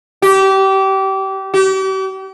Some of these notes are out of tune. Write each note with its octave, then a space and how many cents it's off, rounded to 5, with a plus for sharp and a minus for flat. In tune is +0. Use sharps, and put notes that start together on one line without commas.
G4 -25
G4 -40